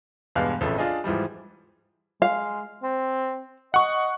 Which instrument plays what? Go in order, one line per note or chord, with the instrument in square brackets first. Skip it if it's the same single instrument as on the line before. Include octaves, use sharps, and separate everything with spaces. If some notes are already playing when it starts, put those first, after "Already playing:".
[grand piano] E2 G2 B2 G#3 F5 F#6
A1 F2 C#3 A3
D4 F4 G#4 D#5
G#2 E3 F3 G3
[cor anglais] G#3 [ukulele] F5
[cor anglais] C4
[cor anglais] D#5 [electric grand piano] F#5 C#6